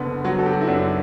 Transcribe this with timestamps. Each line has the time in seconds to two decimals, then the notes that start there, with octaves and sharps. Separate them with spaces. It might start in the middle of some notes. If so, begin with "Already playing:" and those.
Already playing: F#1 D3 B3 B4
0.24 F#3 F#4
0.39 A4
0.46 G4
0.53 F#4
0.61 E4
0.67 F#2 D4